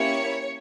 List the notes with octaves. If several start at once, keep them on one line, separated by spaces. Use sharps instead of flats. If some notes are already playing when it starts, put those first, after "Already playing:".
Already playing: A#3 C#4 E4 G4 C#5